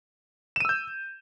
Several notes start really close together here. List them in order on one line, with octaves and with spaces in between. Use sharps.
E7 D#7 E6 G6